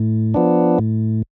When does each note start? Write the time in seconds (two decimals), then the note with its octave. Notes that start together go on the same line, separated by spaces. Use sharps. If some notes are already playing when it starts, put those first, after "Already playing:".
Already playing: A2
0.34 F3 B3 D4
0.79 A2